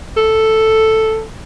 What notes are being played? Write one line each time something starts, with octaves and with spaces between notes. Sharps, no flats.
A4